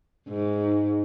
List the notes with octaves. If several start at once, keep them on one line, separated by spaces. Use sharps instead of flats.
G#2